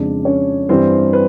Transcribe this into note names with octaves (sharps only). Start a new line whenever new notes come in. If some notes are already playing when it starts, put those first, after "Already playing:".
Already playing: F2 C#3 F3 G#3 D4 D5
C#4 C#5
G2 E3 G3 C4 C5
B4